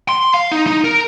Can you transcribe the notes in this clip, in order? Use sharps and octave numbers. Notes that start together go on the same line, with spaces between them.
C6
F5
D#4
D#4
A#4